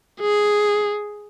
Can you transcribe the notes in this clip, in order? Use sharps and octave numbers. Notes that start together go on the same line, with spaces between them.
G#4